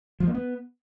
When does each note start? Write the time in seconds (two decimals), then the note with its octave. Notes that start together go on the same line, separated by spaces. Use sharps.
0.20 F3
0.27 A#3
0.35 B3